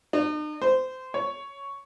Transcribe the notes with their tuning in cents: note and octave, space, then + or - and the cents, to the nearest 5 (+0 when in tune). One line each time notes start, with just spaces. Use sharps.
D#4 -45
C5 -20
C#5 +5